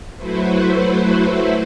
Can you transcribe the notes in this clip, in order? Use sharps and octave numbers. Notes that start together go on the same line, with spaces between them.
F#3 A3 E4 F#4 B4 C5